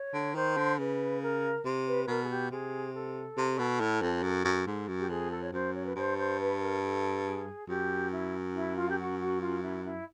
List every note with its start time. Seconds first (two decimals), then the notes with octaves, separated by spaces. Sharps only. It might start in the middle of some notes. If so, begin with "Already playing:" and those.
Already playing: C#5
0.14 D3
0.35 D#3 C5
0.57 D3
0.78 C#3 B4
1.22 A#4
1.65 C3
1.87 B4
2.04 B4
2.08 B2 A#4
2.23 G#4
2.30 G4
2.51 C3 G#4
2.94 A4
3.37 C3
3.59 B2
3.81 A2
4.02 F2
4.23 F#2
4.45 F#2
4.67 G#2
4.88 F#2
4.99 G4
5.09 F2 G#4
5.31 A4
5.42 C#5
5.53 F#2 C5
5.74 C#5
5.85 B4
5.96 G2 C5
6.17 C5
6.40 B4
6.61 A#4
6.82 A4
7.25 G#4
7.68 F#2 G4
8.11 E4
8.54 E4
8.76 F4
8.89 G4
8.98 F#4
9.19 F#4
9.41 F4
9.62 E4
9.84 E4